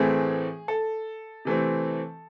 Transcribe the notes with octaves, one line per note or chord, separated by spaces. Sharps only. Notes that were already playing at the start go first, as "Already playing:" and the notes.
Already playing: A2 E3 A3 C4 G#4
A4
C3 E3 A3 C4